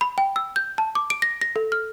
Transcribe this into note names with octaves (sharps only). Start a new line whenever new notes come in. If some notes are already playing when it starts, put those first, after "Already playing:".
B5
G5
E6
G6
A5
D6
D7
A#6
A#6
A4
F6